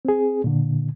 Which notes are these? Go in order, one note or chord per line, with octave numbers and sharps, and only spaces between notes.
C4 G#4
A#2 D3